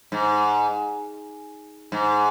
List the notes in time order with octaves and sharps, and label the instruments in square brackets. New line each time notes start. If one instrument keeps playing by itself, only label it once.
[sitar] G#2
G#2